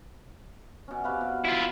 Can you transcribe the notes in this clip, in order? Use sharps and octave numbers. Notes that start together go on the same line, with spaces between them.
B2 C#4
C3 B4 F5
B2
E4 F4